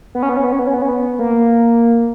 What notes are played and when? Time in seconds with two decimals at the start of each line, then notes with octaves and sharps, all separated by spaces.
0.15 B3
0.23 C#4
0.29 B3
0.37 C#4
0.44 B3
0.52 C#4
0.59 B3
0.67 C#4
0.74 B3
0.82 C#4
0.89 B3
1.19 A#3